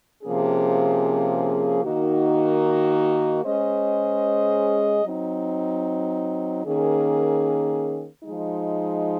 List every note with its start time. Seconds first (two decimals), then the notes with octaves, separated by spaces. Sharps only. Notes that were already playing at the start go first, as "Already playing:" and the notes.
0.23 C3 F3 A#3 C#4 G#4
1.83 D#3 A#3 D#4 F#4
3.43 G#3 C#4 G#4 C5 D#5
5.03 F#3 C4 D#4
6.64 D#3 A#3 C#4 G#4
8.24 F3 G#3 D#4